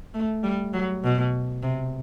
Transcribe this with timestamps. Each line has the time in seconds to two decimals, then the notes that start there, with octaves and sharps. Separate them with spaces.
0.14 A3
0.44 G3
0.73 F#3
1.04 B2
1.63 C3